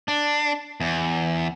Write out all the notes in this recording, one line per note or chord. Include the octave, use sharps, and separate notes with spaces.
D4
E2